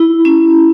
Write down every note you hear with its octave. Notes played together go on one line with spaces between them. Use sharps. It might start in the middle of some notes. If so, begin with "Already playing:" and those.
Already playing: E4
C#4